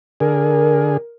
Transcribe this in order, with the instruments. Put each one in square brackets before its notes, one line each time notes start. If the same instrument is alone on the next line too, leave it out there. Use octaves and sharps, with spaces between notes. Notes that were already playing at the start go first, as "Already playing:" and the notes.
[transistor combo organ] D3 G#4 [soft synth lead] A#4